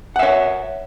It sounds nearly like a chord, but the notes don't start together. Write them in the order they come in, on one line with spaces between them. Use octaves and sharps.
F#5 E5 C#5